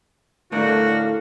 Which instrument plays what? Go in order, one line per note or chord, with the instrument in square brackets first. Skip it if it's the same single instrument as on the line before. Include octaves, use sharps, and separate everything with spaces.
[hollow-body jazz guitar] A2 A3 A#4 [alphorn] D3 [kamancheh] D4 F5 [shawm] F#4